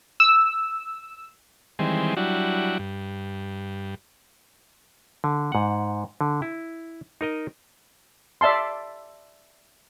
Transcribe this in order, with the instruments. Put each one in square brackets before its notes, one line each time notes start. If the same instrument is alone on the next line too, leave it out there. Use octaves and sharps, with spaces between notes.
[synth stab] E6
[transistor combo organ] D#3 E3 G3 G#3 C4
F#3 G3 D4 E4 F#4
G2
[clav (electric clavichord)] D3
G#2 F#5
D3
E4
D#4 A#4 D#5
[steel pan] D5 E5 A5 C6